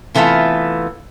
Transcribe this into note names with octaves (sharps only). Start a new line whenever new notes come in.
C3 E3 A3 B3 F4